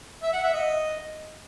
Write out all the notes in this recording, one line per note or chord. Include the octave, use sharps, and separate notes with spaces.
E5
F#5
E5
D#5